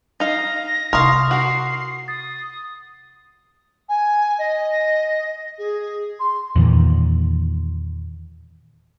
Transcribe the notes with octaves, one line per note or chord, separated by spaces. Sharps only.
D#4 F5 A#6
C3 E4 A#4 F5 C6 C#6 D#6
F#4 A#4 C7
D#6 A6
G#5
D#5
G#4
C6
E2 A#2 D#3